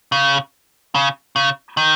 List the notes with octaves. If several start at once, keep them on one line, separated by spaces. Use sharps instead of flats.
C#3
C#3
C#3
D#3